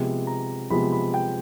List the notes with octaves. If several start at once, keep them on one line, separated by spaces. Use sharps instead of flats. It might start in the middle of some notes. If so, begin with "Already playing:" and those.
Already playing: C3 F3 G#3 B3
A#5
C3 F3 G#3 B3 B5
B5
G5